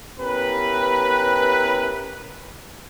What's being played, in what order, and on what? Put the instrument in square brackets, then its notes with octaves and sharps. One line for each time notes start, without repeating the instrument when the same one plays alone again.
[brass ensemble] B3 C#4 E4 G4 A#4 B4